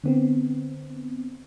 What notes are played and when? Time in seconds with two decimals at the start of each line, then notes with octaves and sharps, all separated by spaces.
0.04 D3 B3 C4